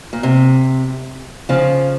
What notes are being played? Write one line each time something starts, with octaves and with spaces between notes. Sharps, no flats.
A#2
C3
C#3 F3